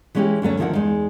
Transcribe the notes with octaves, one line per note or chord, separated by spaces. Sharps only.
E3 G#3 C#4 D#4 E4 G4
D2 F#3 A3 C#4
D2 D#3 F3 E4 A#4 F#5
E2 G#3 D#4